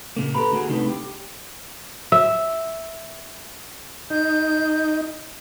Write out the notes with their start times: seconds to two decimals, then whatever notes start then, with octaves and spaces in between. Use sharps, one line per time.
0.16 A#2 C#3 A#3
0.35 G4 A4 B4 A#5 B5
0.52 D3 A#3 F#4 G#4
0.69 C3 G3 A3 D4 D#4 B4
0.88 G4
2.12 E5
4.10 D#4 G6